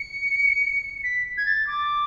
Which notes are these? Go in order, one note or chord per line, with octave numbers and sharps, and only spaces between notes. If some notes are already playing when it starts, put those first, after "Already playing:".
Already playing: C#7
B6
G#6
A6
D6